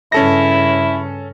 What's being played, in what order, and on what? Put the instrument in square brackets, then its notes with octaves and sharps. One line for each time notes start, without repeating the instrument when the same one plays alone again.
[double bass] G2 C#3 [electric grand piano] C#4 A4 A#6 [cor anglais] E4